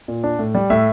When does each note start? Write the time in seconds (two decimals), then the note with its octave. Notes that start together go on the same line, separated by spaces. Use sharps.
0.08 A#2
0.24 D4
0.39 A2
0.55 G3
0.70 A2 E5